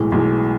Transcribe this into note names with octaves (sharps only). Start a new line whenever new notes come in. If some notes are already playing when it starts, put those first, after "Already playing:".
Already playing: B1 A2 E3 G#3
B1 A2 E3 G#3